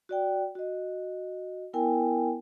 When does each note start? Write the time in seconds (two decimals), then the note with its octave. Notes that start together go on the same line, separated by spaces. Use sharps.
0.09 F#4 D5 G5
0.55 F#4 D#5
1.73 B3 E4 A#4 G5 G#5